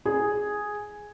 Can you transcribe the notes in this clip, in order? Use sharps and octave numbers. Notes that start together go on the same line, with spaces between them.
G#4